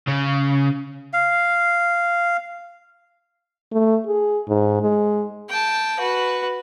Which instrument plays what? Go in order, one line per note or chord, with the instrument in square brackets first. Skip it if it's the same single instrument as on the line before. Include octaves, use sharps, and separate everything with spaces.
[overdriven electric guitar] C#3
[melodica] F5
[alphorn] A3
G#4
G#2
G#3
[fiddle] G5 A5
F#4 B4